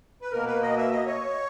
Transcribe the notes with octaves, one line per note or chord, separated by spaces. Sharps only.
B4
B2 A#3 A#4
B4
D#5
E5
D#5
C#5